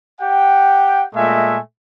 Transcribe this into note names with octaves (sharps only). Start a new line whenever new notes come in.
G4 F#5 G5
A#2 G#3 A3 E5 G#5